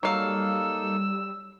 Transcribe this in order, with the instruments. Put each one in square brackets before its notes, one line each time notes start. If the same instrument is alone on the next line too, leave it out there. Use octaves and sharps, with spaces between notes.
[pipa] F#3 F5 [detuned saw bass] G3 [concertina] A#3 D#4 A4 [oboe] E6